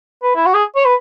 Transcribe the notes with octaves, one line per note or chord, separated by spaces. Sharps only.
B4
E4
F#4
G#4
C#5
B4